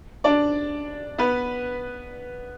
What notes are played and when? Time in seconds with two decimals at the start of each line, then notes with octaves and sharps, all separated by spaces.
0.24 D4 D5
1.18 B3 B4